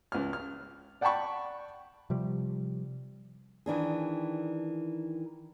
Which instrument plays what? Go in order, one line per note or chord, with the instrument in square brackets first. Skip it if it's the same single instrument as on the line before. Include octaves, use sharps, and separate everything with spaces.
[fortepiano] C#2 F6
F6
D5 F#5 G5 A5 B5 C#6
[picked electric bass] C3 F3 G3
[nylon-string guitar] D#3 E3 D4 G#4